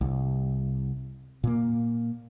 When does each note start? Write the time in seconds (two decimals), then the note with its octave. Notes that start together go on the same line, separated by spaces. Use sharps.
0.01 C2
1.44 A#2 A#3